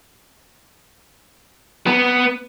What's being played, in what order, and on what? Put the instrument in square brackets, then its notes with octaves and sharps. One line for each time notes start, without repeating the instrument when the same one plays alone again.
[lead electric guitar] B3